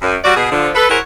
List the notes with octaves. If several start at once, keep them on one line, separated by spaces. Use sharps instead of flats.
F#2
G3 F#4 D5
B2 G#4
D3 F3
A4 B4
E4 F#4 G#4 A#4 C5 C#5